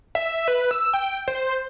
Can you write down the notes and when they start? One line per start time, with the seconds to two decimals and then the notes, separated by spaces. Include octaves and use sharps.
0.15 E5
0.48 B4
0.71 E6
0.93 G5
1.28 C5